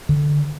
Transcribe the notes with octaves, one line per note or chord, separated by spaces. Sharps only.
D3